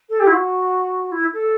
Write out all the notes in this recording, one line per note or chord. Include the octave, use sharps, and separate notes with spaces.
A4
G4
E4
F#4
E4
A4